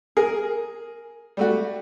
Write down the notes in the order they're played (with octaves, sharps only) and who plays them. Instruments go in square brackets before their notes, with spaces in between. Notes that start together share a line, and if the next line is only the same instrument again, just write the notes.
[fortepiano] G#4 [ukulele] A#4
[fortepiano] G3 A3 F#4